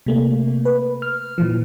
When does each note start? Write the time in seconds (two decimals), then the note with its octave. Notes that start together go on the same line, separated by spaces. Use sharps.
0.06 C3 A3 A#3
0.65 B4
1.02 F6
1.38 A#2 E3 F3